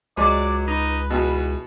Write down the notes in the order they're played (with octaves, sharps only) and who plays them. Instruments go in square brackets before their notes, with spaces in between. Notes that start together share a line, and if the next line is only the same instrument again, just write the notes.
[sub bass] C#2 [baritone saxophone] F#3 [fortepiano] G#3 D6 [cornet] D5
[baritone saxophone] D#4 [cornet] B4
[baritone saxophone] E2 [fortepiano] B2